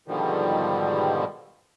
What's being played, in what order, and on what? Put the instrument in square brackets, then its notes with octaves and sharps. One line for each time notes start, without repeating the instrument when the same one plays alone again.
[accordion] G#2 B2 D3 D#3 F3 G3